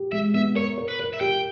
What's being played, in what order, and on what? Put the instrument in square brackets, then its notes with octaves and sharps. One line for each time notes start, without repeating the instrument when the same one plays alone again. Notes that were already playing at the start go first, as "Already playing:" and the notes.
Already playing: [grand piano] G4
[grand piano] G#3 [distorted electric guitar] E5
[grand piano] B3 [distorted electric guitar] E5
[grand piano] A#4 [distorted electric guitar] C#5
[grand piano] A#4
[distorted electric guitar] B4
[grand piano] A#4
[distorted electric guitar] E5
[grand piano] G4 [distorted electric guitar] G5